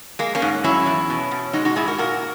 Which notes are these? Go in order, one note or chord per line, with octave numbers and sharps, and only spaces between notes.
G#3 A#3
A#3 C#4
G#2
F#3 C#4 E4
E2
B2
B2
G#3 D#4 F#4
D#4 F#4
G#2 E4 G#4
F#4 A#4
A#2 F#4 A#4